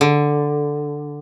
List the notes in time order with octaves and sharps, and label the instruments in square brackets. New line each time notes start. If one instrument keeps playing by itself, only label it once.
[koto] D3